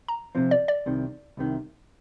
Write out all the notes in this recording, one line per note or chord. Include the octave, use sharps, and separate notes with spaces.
A#5
C3 F3 C4
D5
D5
C2 C3 D#3
C2 C3 D#3